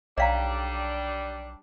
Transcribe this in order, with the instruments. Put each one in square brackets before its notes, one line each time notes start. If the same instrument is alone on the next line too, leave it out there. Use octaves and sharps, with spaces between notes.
[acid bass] B1 [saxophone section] G3 D4 [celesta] C#5 G5 A#5 [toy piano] D5 F5